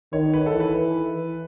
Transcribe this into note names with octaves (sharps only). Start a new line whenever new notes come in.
D#3 C#5
B4
A4
E3
B4